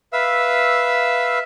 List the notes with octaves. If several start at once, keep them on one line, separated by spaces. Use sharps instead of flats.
B4 E5 F5 E6